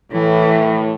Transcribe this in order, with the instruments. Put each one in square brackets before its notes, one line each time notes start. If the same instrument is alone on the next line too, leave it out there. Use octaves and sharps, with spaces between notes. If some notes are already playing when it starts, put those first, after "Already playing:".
[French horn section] A2 [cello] E3